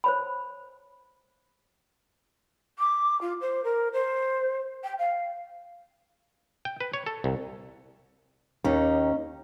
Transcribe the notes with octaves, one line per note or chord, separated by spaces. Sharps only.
C5 C#5 B5
D6
F4
C5
A#4
C5
G5
F5
G5
B4
C#5
A4
C2
D#2 C#4 D#4